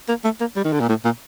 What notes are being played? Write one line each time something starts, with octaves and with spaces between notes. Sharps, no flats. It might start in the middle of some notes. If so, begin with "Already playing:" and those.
A#3
A3
A#3
G3
D#3
D3
A#2
A2
A#2